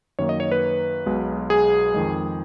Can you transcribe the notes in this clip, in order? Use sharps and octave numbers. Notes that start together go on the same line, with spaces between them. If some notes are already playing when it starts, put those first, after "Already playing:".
F#2 D#3 A#3 C#5
D#5
C#5
B4
B1 B2 G#3
G#4
F2 D#3 G#3